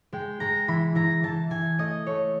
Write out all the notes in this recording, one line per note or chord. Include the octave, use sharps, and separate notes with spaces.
G#3 G5
G#3 A#5
E3 B5
E3 A#5
E3 A5
E3 G#5
A3 D#5
A3 C#5